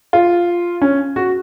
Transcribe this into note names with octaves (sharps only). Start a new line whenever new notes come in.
F4
C#4
F#4